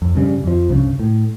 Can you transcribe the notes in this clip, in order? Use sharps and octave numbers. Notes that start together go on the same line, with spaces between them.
F2
G2 C#3 G3
F2 F3
C2 G2 C#3
A2